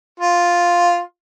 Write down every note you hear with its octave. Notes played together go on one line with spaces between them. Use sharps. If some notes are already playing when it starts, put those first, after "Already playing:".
F4